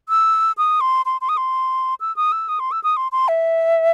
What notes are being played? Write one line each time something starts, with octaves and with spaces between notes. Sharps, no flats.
E6
D#6
C6
C6
C6
D#6
C6
E6
D#6
E6
D#6
C6
E6
D#6
C6
C6
E5